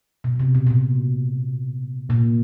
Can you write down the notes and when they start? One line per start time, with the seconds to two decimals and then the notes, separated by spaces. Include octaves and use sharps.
0.24 B2
0.40 C3
0.55 B2
0.67 B2
0.70 A#2
2.10 A#2